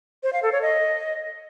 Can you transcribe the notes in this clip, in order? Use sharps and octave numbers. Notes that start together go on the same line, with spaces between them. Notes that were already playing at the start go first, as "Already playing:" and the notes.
C5
F5
A4
C#5
D#5